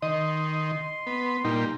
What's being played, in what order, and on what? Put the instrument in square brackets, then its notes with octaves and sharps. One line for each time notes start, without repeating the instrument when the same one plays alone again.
[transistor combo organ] D#3 [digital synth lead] D#5 [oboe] C6
[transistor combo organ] B3
[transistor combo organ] A#2 G3 [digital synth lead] D#4